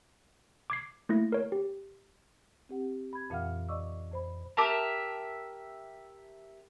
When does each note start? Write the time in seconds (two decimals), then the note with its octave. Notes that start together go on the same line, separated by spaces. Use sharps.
0.70 D6 G#6 C7
1.09 A3 A#3 E4 A#6
1.32 A#4 C#5
1.52 G4
2.69 C4 G4 F#5
3.13 B5 G#6
3.30 F2 A#2 E3 F5 F#5 F6
3.69 D5 D#5 C#6 D6 E6
4.11 F2 C5 B5
4.57 G4 A#4 E5 A5